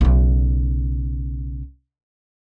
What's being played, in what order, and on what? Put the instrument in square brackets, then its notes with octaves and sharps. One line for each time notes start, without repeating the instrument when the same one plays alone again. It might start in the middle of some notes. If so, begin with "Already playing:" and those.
[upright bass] B1 C#3